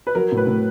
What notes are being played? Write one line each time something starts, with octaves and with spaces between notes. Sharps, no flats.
B4
F#3 A#4
A2
B4
A2